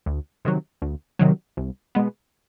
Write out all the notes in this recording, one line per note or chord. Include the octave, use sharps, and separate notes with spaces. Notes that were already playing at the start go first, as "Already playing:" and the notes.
D2
C3 D#3 F#3
D2
C3 D#3 F#3
C2
B2 G#3 B3